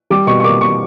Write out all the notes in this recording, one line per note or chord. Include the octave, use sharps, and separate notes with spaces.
G3 D6
B2 C#6
C#6
A#3 D6
B2 C#6